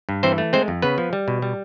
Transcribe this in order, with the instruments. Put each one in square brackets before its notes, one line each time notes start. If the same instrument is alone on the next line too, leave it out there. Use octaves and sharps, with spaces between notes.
[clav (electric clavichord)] G2
E3 C4 C5
A3
G#3 C4 C5
F2
C#3 B3 B4
F3
G3
B2
G3